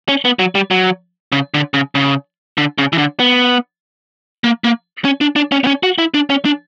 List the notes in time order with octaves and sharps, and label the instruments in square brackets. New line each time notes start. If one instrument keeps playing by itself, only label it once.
[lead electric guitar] C#4
B3
F#3
G3
F#3
C#3
D3
C#3
C#3
D3
C#3
E3
D3
B3
A#3
A#3
C#4
D4
D4
C#4
B3
C#4
F#4
E4
D4
C#4
D4